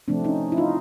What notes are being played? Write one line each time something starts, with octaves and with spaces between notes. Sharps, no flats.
C3 F3 A3 C4 D4
C#4 D#4
E4
D#4 F4